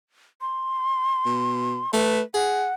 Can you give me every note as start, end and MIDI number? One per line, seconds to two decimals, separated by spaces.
0.41 1.91 84
1.25 1.80 47
1.94 2.20 57
1.94 2.21 71
2.34 2.67 68
2.34 2.74 78